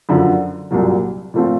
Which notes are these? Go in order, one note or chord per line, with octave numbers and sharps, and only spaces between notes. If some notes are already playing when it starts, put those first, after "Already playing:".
F#2 D3 F3
C2 A#2 F#3
A#2 F3 A3 C4 F4